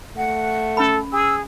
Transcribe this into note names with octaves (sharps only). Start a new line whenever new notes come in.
A3 F#5
C#4 A4 B5
G#4 E6